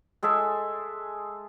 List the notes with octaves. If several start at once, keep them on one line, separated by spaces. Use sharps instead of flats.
G#3 G#4 A4 E5